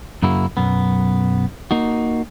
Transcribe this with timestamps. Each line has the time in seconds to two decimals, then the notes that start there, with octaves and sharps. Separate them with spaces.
0.23 F#2 C#3 A#3 E4 F#4
0.57 B1 F#2 B3
1.71 A#3 D#4 F#4